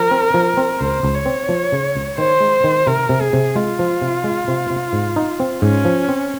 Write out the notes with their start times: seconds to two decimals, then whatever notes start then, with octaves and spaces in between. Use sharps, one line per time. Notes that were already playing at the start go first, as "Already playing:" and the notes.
Already playing: F3 A#4
0.11 C4
0.34 F3
0.57 C4
0.80 C#2 C5
1.03 C#2
1.15 C#5
1.26 C4
1.49 F3
1.72 C#3
1.95 C#2
2.18 D#3 C5
2.41 G#3
2.64 D#3
2.87 C3 A#4
3.09 C3
3.21 G#4
3.33 C3
3.56 G#3 F4
3.79 F3
4.02 C3
4.24 G#3
4.48 C3
4.70 C3
4.93 G#2
5.16 D#4
5.40 C4
5.62 G#2 C#4
5.85 F3
6.08 C4